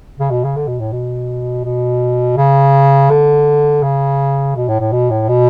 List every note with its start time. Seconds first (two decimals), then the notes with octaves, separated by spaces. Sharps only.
0.19 C#3
0.31 B2
0.44 C#3
0.56 D3
0.67 B2
0.79 A2
0.92 B2
1.64 B2
2.37 C#3
3.10 D3
3.82 C#3
4.56 B2
4.68 A2
4.80 A2
4.92 B2
5.10 A2
5.29 B2